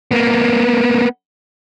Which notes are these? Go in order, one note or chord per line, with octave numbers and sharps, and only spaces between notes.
A#3 B3